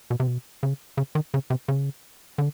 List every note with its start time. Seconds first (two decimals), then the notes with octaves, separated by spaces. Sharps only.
0.10 B2
0.20 C3
0.27 B2
0.63 C#3
0.97 C#3
1.15 D#3
1.34 C#3
1.50 C3
1.68 C#3
2.38 D3